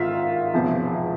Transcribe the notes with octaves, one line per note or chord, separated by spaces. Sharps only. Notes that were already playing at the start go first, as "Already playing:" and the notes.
Already playing: G#1 G#2 D#3 F4 E5
E1 E2 C3 F3